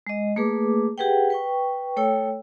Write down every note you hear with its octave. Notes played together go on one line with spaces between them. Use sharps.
G#3 D#5
A3 A#3 G#4 B4 D6
G4 G#4 B4 F#5 G5
B4 G5 C#6
A3 A4 C#5 G5 E6